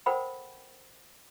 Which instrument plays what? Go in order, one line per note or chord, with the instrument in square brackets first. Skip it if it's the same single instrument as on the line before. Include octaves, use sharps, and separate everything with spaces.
[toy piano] A4 A#4 C5 F#5 G5 B5